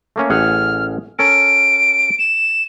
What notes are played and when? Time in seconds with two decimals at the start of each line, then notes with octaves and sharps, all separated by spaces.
0.16 A3 A#3 C#4
0.30 A1 G#4 F#5 F6
1.19 C#4 A4 A#4 D7
2.19 E7